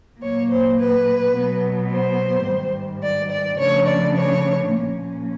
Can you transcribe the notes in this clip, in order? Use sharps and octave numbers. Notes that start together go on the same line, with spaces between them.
A#2 F#3 A#3 C#5
C5
B4
B2 F#3 B3
C5
G#2 D#3 G3
D5
D5
C#3 F3 A3 D4 C#5
D5
C#5
A#2 F3 A#3 C#4